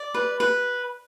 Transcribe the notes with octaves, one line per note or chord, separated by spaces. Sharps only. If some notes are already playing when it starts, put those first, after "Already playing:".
Already playing: D5
B4
B4